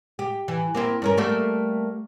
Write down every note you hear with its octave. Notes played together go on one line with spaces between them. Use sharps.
G4
E3
A#3 C4 E4
G2 C#4 A#4
G3 A3 A#3